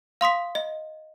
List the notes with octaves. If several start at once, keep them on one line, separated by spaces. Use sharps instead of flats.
F5 C6 D#6 B6
D#5